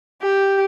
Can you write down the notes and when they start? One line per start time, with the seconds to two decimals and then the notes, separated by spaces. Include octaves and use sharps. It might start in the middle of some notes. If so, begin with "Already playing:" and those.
0.22 G4